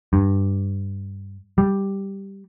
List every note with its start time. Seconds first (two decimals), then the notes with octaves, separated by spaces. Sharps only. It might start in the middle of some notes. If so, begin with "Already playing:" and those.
0.13 G2
1.58 G3